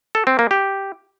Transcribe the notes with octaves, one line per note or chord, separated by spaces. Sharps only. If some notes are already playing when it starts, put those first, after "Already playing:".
A4
C4
A#3
G4